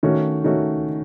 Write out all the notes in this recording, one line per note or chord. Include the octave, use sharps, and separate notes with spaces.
D#3 A3 C#4 F#4
D#3 A3 C#4 F#4